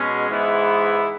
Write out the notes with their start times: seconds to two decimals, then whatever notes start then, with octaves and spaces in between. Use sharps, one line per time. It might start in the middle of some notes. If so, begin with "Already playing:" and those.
Already playing: B2 G#3 C#4
0.30 G#2 E3 G#3 B3 E4